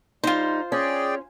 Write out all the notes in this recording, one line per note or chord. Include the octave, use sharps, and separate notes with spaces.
G3 D#4 F4 C5
C#4 G#4 D5 G5